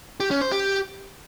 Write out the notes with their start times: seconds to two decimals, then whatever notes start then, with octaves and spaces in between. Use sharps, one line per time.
0.20 G4
0.31 C#4
0.41 C5
0.52 G4